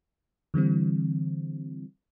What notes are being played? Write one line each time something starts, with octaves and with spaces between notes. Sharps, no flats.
D3 E3 G3 C4